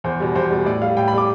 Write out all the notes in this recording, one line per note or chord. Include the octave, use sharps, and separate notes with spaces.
E2 C5
B2 G3
E2 C5
B2 G3
A2 D5
G3 F5
A2 G5
B5
G3 D6